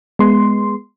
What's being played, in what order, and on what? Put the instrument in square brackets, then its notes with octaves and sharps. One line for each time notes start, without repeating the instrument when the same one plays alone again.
[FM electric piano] G#3 B3 C6